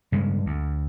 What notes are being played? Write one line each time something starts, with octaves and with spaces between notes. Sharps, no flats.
G2 C#3 G#3
D2